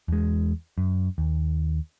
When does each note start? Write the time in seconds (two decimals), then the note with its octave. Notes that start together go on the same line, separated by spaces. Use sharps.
0.08 E2 G#3
0.78 F#2
1.18 D#2